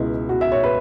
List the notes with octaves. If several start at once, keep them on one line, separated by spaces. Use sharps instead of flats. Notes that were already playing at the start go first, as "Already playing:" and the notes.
Already playing: C#2 B2 G#3 E4
F#4
E5
C#5
B4